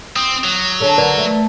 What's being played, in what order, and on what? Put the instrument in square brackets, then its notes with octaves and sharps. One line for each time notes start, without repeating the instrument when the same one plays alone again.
[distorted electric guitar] C4 [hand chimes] D#6
[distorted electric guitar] F#3
[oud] D3 C#4 A4
[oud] D3 [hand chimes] A#4 B4 D5
[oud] A3